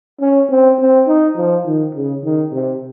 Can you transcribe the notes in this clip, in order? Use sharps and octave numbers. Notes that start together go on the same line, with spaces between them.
C#4
C4
C4
D#4
F3
D#3
C#3
D#3
C3